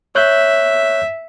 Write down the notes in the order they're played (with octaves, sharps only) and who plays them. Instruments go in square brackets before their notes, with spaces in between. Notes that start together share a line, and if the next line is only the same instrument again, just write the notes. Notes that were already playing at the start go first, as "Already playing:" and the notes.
[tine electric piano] C#5 F#6 G6 [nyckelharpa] E5